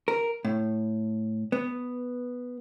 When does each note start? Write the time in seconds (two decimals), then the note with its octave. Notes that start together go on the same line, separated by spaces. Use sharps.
0.08 A#4
0.45 A2
1.52 B3